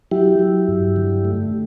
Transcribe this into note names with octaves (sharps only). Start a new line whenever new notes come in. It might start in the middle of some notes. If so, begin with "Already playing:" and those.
F#3 E4 G4
F#3
G2
D3
A3